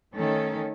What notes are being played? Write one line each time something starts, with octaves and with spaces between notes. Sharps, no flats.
D#3 A3 C#4 A4